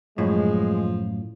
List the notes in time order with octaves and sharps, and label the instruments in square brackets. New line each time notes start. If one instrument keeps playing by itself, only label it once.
[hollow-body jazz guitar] F#2 A2 [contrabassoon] F3 [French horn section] G#3